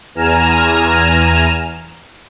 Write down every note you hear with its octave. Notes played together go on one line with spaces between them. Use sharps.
E2 G#5 A#5 F6 E7